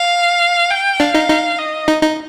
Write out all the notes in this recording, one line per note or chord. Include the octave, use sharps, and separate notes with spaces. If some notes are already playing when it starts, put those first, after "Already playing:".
Already playing: F5
G5
D4 F5
D#4
D#4
D#5
D#4
D#4